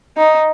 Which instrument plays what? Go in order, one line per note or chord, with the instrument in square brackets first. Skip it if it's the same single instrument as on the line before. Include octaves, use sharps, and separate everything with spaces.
[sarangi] D#4